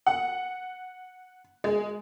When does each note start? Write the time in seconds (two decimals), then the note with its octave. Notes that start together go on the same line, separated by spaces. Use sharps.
0.06 F#5
1.64 G#3